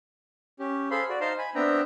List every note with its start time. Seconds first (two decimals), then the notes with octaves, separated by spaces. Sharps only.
0.59 C#4 G4
0.91 G#4 A4 C5 F5 B5 C6
1.09 F#4 D5
1.21 D#4 C5 F5 A5 A#5 C6
1.38 G#5 B5
1.55 B3 C4 D4 E5 G5 A#5